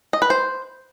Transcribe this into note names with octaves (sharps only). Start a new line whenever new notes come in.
D#5
B4
C5